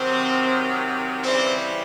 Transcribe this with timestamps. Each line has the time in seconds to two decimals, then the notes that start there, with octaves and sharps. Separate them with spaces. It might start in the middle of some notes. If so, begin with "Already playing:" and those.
Already playing: C3 D#3 F#3 C4
1.24 C#3 E3 G3 C4